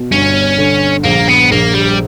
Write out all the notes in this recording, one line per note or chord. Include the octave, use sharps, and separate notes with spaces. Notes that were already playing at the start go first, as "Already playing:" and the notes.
Already playing: B2
G1 C#4
D3
A#1 A#3
B3
A#1 A#3
G3